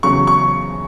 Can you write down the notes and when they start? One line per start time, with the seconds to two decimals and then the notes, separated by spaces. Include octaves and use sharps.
0.03 E2 C#3 F#3 C#6
0.27 C#6